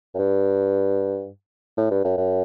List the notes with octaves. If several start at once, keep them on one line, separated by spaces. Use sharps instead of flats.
F#2
G2
A2
G2
F#2
F#2